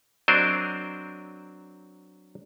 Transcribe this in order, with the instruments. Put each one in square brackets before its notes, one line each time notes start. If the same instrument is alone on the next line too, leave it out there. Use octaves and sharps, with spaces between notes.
[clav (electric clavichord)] F#3 C4 D4 A#4 C5 D#5